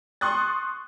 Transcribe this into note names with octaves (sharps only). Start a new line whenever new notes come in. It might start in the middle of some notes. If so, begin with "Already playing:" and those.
C6 C#6 D#6 F#6 A6